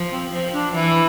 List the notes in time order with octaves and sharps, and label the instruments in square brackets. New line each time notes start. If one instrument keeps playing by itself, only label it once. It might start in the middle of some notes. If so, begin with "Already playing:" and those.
Already playing: [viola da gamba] F3
[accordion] C4
[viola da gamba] F3 [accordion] C4
[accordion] D4
[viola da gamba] E3 [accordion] E4